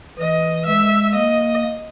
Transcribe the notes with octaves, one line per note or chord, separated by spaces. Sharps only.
E3 D#5
G#3 E5
A#3 D#5